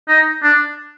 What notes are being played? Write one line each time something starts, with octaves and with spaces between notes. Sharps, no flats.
D#4
D4